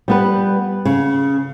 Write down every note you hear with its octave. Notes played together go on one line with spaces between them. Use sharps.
G3 B3 B4
C#3